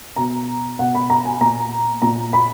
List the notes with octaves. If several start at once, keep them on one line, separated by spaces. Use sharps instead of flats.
B2 A#5
B2 F#5
B5
A#5
G#5
A#2 A#5
A#2 A#5
B5